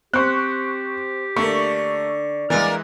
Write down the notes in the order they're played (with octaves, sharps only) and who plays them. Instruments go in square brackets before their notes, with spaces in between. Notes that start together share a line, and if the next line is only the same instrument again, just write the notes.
[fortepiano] C4 C5 [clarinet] G4 [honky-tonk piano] C#6 F#6
[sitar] D3 [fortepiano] A3 A#3 [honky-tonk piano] C#6
[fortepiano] E3 G#3 [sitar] A#3 A#4 [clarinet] D5